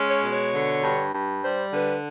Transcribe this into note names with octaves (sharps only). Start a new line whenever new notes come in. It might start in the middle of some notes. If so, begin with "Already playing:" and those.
Already playing: G#3 C#4
C#5
B2
C#5
D3
G2
G2
G3 C5
D3 B4